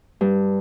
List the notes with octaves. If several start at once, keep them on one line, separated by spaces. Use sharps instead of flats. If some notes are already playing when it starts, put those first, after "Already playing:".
G2